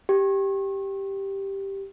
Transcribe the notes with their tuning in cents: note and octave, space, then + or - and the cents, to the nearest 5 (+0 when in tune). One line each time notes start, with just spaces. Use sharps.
G4 +0